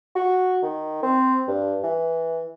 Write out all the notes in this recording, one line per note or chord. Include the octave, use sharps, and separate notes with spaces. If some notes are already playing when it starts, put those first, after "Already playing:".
F#4
D#3
C4
G2
E3